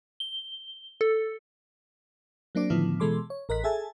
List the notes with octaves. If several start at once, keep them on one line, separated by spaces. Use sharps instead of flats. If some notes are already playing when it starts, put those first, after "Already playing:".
G7
A4
F#3 A#3 C4 D4 D5
A2 D3 D#3 F3 B3 E4
B2 E3 G#3 A4 C6 D6
C#5
A1 A#4 D#5 F#6 B6
G#4 A4 E5 G#5 A5